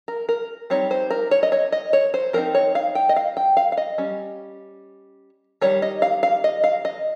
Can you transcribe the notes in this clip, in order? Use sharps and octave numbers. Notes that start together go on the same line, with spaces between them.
A#4
A#4
G3 C4 D#4 C#5
C5
A#4
C#5
D#5
C#5
D#5
C#5
C5
F3 C4 D#4 A#4
C#5
F5
G5
D#5
F5
G5
F5
F5
D#5
G3 C#4
D#3 G3 C#4 C#5
D#5
F5
F5
D#5
F5
D#5